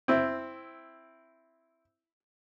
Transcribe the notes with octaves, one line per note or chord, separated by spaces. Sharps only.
C4 E4